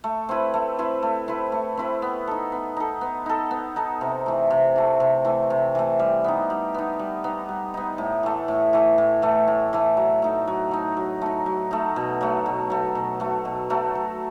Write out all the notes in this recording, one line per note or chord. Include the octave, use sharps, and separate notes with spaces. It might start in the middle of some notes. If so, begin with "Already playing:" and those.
A3
C4 E4 B4
A3
C4 E4 B4
A3
C4 E4 B4
A3
C4 E4 B4
B3
D#4 A4
B3
D#4 A4
B3
D#4 A4
B3
D#4 A4
C3
E3 A3
C3
E3 A3
C3
E3 A3
C3
E3 A3
G3
B3 D#4
G3
B3 D#4
G3
B3 D#4
G3
B3 D#4
A2
E3 A3
A2
E3 A3
A2
E3 A3
A2
E3 A3
F#3
A3 D#4
F#3
A3 D#4
F#3
A3 D#4
F#3
A3 D#4
B2
F#3 A3
B2
F#3 A3
B2
F#3 A3
B2
F#3 A3
F#3